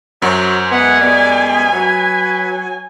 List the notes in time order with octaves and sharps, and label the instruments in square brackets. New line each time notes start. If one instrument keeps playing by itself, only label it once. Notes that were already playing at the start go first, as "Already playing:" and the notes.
[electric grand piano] F#2 [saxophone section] F#3 [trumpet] C5
[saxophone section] G#3 B3 [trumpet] F#5 [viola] G#5
[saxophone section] G3 G#3 B3 [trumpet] D5
[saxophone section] F#3 [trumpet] B4